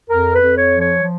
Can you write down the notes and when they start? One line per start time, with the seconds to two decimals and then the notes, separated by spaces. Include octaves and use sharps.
0.10 F2 A#4
0.34 B4
0.42 F2
0.57 C#5
0.73 F3
0.80 C#5
1.03 F3